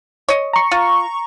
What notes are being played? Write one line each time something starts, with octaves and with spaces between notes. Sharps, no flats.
C#5 D#5
A#5 C#6
F4